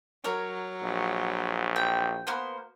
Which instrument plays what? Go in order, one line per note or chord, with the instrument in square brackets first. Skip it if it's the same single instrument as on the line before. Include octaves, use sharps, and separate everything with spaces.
[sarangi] F#3 [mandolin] A#4 C#5
[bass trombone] A#1
[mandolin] G5
A#3 B3 C5